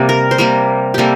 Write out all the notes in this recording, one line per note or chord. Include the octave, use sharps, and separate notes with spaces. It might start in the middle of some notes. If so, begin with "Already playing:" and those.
Already playing: C3 G3 A#3 D5
A#4
C5
C3 G3 A#3 A#4
C3 G3 A#3 G4 A4